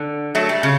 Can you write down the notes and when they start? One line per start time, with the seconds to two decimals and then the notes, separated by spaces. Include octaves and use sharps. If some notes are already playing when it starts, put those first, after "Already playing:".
Already playing: D3
0.35 F#3 A3
0.49 G3
0.63 C#3